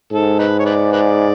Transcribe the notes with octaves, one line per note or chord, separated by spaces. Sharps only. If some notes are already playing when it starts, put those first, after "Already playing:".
G#2 A4
D#4 B4
C#5
B4 D5
B4 D5